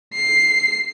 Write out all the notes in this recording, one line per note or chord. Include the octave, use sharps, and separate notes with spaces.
C7